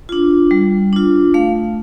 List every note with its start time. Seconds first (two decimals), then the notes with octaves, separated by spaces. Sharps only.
0.09 D4 F4
0.51 G3
0.93 D4 F4
1.34 A3 F5